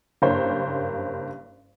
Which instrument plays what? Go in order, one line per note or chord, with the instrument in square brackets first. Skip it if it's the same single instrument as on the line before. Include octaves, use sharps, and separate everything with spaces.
[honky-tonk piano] F#1 G2 A#3 C5 C#5